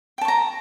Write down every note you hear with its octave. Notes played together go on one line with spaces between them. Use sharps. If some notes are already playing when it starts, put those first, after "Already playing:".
G5 A5 A#5 C#6